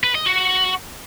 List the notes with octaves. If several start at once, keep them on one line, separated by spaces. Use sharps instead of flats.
B4
D#5
F#4